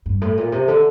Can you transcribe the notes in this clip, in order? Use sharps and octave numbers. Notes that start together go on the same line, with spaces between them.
G2
A2
A#2
C3
D3